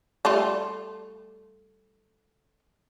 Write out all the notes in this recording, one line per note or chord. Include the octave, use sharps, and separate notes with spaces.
G3 A3 F4